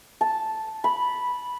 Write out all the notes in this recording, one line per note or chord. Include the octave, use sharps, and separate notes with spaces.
A5
B5